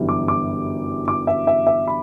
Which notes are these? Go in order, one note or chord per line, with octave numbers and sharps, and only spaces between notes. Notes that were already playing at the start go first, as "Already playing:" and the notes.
Already playing: G1 F#2 E3 G3
D6
D6
D6
E5
E5
E5
B5